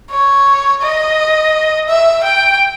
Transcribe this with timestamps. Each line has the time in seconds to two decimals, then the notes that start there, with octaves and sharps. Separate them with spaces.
0.10 C#5
0.82 D#5
1.88 E5
2.24 G5